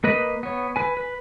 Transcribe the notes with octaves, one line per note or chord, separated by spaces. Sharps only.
A#3 B4 D#5 B5
B3 C#5
B4 G#5
B4